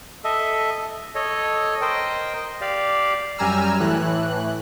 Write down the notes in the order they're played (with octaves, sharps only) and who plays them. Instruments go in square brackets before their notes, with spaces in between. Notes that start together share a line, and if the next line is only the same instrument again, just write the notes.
[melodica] A4 D#5 E5
[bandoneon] A4 C#5 D#5
A#4 C5 D#5 G5
G4 D5 F5
[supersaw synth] F#2 G3 G#5 A#5 E6 F6
A2 E3 F#6